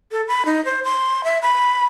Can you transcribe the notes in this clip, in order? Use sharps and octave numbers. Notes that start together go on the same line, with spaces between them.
A4
B5
D#4
C5
C6
E5
B5